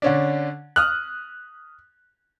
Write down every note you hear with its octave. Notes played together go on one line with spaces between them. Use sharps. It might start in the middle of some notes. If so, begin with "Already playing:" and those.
D3 C#4 D4
D#6 F6 F#6